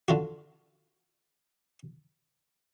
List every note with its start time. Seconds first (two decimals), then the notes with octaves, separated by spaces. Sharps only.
0.08 D3 F4 F#4